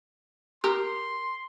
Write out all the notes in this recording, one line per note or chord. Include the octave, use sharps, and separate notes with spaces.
G4 A#4 C6